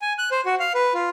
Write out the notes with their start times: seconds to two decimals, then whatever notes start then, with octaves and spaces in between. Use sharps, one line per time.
0.02 G#5
0.19 F#6
0.31 C5
0.45 F#4
0.60 F5
0.74 B4
0.94 F4